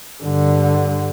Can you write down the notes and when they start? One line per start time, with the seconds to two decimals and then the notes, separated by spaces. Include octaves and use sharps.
0.23 G2 D3